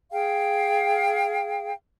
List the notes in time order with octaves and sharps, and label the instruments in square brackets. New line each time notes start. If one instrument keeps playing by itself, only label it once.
[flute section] G#4 F5 G5